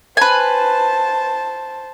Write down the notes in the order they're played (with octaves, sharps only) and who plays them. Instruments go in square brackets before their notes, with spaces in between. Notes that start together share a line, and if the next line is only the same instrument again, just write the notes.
[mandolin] B4 G#5 [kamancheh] C5 A5